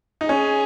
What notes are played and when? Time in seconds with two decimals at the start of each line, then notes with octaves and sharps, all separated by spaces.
0.21 D#4
0.28 C#4 G#4